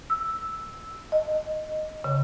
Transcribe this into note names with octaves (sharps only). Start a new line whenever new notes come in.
E6
D#5
C#3